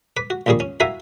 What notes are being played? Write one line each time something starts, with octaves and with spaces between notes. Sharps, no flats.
B4 D6
F#4
A#1 D#2 A#2 G3 G#4 C#6
C#4
E4 F#4 A#4 E5 F5 G#5